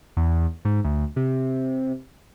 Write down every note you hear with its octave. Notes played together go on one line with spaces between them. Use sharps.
E2
G#2
D2
C3